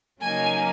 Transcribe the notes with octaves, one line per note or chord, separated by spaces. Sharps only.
C#3 F#3 A#3 D#4 G#5